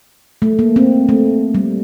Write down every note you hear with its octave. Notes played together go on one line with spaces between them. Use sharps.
A3
A#3
C4
A3
G3